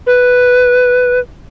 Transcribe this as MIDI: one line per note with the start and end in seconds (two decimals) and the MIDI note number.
0.07 1.20 71